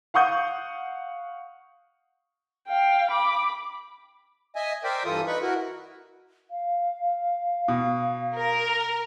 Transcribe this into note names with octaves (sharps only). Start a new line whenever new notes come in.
F5 F#5 C#6 D#6 G6
F5 G5
B5 D6
D#5 E5 G#5
A#4 C5 D5 E5 G5
G2 E3 F4 A4 D#6
D#4 B4 B5 C#6
E4 F#4 A#4
F5
B2
A#4